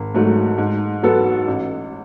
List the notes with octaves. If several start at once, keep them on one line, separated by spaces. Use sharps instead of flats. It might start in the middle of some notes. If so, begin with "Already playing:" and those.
Already playing: G#1
G#2 F#3 A3
G#2
F#3 B3 F#4 A4
A1